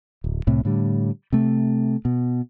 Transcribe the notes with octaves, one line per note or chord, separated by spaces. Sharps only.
D1
C2 A2 C3
A2 D3 G3
C3 A3
B2